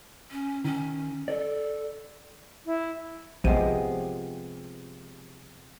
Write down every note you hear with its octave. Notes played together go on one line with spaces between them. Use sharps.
C#4
D#3 C#4
A4 D5
E4
A#1 C3 F3 G#3 B3 G4 D#7